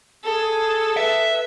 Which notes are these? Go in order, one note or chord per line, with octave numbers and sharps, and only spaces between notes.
G#4 A4
B4 E5